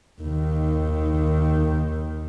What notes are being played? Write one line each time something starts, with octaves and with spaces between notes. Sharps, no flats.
D#2 D#3